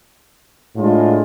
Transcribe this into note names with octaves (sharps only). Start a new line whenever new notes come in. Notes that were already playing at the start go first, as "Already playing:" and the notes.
A2 G#3 D4 F4